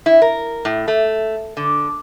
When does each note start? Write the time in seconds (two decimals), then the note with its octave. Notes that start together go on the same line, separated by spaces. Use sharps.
0.06 E4
0.22 A#4
0.65 A2
0.88 A3
1.57 D3